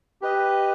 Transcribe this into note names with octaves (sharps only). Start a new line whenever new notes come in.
G4 B4 D#5